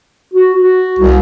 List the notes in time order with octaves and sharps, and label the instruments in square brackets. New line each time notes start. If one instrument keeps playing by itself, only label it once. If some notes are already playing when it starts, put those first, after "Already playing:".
[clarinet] F#4
F#4
[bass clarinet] C2